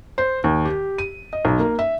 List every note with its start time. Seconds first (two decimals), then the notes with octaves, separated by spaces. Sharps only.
0.18 C5
0.44 D#2
0.65 G4
0.98 D#7
1.33 D#5
1.45 B1
1.59 A#3
1.79 E5